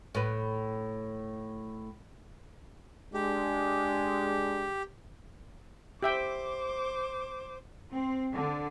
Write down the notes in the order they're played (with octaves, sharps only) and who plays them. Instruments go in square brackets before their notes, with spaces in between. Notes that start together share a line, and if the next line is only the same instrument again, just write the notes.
[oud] A2 B4
[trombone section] G#3 D4 [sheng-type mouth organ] G4
[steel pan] G4 E5 G5 [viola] C5 D6
[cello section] C4
D3